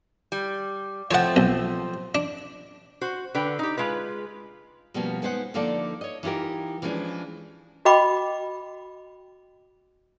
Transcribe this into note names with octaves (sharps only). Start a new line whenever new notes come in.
G3
F3 A3 C4 C#5 F#5
B1
D4
F#4 C5
D3 B4 G5
D#4 G4
G#3 F4 B4
B2 F3 G3 A#3 B3 C#4
G#3 B3 D#4 C5 D#5 F#5
D3 F3 A#3 D#4 A4 D5
C#5 D#5
E3 D#4 F4 G4 A#4
E3 F3 G#3 B3 C#4 D4
F#4 D#5 G5 B5 D6